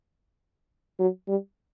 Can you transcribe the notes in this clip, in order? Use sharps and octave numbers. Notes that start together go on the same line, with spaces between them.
F#3
G3